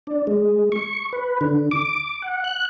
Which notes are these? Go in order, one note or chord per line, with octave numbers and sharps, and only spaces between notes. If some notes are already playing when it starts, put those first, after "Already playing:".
D4
G#3
C#6
B4
D3
D6
F#5
F#6